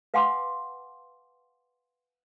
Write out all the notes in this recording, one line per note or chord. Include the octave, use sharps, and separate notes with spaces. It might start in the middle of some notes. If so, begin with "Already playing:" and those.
B4 F5 F#5 G#5 C6 D6